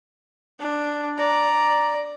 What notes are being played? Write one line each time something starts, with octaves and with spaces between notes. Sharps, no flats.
D4
D5 A#5